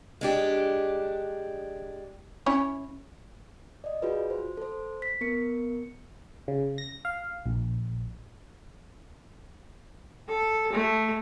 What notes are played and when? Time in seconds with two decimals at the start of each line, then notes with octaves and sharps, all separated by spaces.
0.21 G#3 D4 G4
2.46 C#4 E4 C#5
3.84 D5 D#5
4.02 F4 F#4 G#4 B4
4.30 C5
4.57 A4 C5
5.02 B6
5.21 B3 A#4 C#7
6.48 C#3
6.78 A#6
7.05 F5
7.46 A#1
10.28 A4
10.72 A3